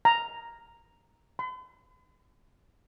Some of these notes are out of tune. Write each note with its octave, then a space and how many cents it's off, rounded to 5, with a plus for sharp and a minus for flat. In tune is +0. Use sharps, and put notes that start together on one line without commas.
A#5 +0
B5 +45